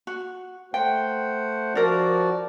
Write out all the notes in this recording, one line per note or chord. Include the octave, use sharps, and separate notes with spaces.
F#4
A3 C5 F#5 G5
F3 D4 F#4 A#4 D5